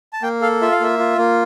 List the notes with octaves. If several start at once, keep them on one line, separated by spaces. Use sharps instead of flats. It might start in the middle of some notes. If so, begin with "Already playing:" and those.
A5
A#3 G5
A4 F5
F4 E5
F5
A#3 E5
F4
A#3